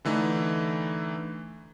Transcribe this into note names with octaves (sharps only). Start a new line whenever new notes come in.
D3 E3 A3 D#4